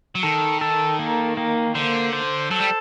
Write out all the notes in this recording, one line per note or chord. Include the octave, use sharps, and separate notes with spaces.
F#3
D#3 A4
A4
A#3
A#3
D3 C5
C5
F#3 A4
G3